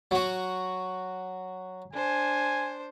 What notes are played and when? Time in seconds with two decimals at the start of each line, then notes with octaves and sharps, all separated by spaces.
0.11 F#3 F#4
1.93 D4 C5 G#5